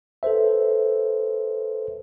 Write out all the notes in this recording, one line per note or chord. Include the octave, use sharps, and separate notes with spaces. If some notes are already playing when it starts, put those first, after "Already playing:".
A4 B4 C5 E5